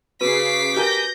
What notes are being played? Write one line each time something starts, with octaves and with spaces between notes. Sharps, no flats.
C#3 F#4 B4 D6 B6 C7 D#7
G4 A#4 G#5 G6 A#6